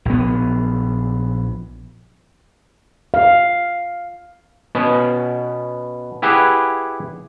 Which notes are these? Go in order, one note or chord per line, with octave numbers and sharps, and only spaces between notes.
A#1 B3
F5
B2 B3 C#4
E4 G4 G#4 B4 F#5